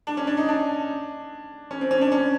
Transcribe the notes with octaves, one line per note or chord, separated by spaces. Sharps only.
D4
C#4
D4
D#4
D4
C#4
C4
C#4
D4
C#4